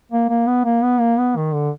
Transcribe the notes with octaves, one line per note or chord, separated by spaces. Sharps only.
A#3
A#3
B3
A#3
B3
A#3
B3
D#3
D3